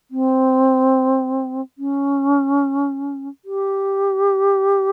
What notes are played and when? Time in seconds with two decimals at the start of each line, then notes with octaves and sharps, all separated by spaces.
0.11 C4
1.78 C#4
3.45 G4